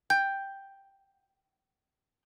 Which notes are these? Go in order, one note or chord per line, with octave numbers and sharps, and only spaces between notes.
G5 G6